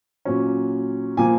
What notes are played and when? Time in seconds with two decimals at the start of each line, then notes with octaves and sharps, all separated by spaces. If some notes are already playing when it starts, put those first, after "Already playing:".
0.25 A#2 F#3 C#4
1.17 A#2 F3 A#3 G#5